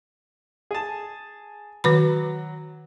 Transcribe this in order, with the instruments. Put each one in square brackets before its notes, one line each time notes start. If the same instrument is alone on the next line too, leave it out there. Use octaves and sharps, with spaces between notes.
[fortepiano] G#4 A5
[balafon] D#3 B4 B5 [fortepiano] F#3